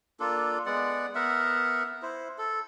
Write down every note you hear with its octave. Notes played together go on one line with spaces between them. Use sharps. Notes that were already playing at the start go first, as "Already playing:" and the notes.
A#3 D4 F4 A4
G#3 B3 D5 F#5
B3 A#4 E5 F#5
E4 C5
A4